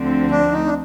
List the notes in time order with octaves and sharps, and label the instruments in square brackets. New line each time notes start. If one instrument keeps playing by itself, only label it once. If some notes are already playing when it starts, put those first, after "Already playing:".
Already playing: [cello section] D2 D3 F3 C4
[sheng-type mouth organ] D4
D#4
D4